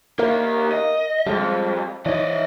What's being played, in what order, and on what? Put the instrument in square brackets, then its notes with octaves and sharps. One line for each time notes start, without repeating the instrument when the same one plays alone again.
[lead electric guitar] D#3 A#3 [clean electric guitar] A#4 E5 F5
[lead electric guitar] D#5
[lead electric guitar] F2 [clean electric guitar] G3 G#3
[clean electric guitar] E3 D#4 [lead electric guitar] D5 D#5